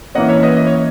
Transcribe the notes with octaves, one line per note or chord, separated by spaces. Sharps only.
E3 A#3 C#4 D#5 F#5
C#5 E5
B4 D#5
D#5
C#5